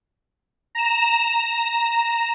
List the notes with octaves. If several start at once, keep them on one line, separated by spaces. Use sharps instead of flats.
A#5 E7